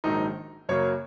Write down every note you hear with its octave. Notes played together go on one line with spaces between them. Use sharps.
A#1 G#2 D#3 F#3 D#4
F#2 C#3 F#3 A#3 C#5